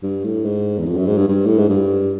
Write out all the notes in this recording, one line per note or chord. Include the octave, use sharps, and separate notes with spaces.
G2
A2
G#2
E2
F2
F#2
G#2
G2
G2
A2
G#2
G2